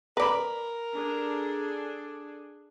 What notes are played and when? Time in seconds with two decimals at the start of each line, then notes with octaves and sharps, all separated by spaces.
0.17 A#4 B4 D5 A#5 B5
0.94 D4 G#4 A4